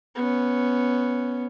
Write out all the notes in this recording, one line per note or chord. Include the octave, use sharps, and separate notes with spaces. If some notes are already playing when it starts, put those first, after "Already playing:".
B3 C#4